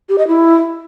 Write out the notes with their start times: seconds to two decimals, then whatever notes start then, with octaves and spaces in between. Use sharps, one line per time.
0.09 G4
0.18 D#5
0.28 E4